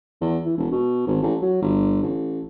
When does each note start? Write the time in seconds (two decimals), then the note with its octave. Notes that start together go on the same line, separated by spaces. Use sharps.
0.21 E2
0.45 E3
0.57 E1
0.71 B2
1.07 G#1
1.22 A1
1.42 F#3
1.62 G1
2.02 A1